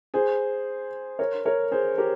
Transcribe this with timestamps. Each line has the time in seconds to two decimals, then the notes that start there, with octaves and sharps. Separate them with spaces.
0.14 G#4 C5
1.19 A#4 C#5
1.45 A#4 C#5
1.71 G#4 C5
1.98 G4 A#4